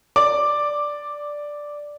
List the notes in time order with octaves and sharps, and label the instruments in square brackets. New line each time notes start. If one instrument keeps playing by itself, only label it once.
[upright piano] D5 [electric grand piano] D6